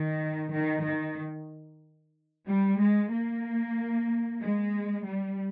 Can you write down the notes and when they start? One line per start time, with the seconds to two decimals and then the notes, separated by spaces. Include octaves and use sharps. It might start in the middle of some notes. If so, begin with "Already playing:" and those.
Already playing: D#3
0.53 D#3
0.85 D#3
2.47 G3
2.79 G#3
3.11 A#3
4.40 G#3
5.05 G3